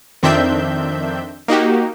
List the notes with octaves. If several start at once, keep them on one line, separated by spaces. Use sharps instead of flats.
F2 D#3 C4 D4 E5 G6
A#3 D#4 F#4 G4